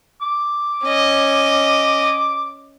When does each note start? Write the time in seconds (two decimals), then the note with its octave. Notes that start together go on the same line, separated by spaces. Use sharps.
0.21 D6
0.84 C#4 D#5